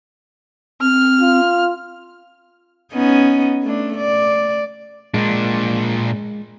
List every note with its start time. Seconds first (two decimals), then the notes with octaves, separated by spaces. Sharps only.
0.81 C4 F6
1.20 F4
2.93 B3 C#4 D#4
3.63 A3 D4
3.98 D5
5.14 A#2 G#3 D4